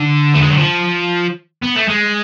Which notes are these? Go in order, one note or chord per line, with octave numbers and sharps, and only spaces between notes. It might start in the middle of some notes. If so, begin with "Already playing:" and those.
Already playing: D3
A3
G#3
F#3
F3
B3
A3
G#3